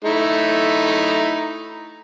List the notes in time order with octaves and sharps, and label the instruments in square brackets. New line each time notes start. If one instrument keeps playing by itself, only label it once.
[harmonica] A3 D#4 E4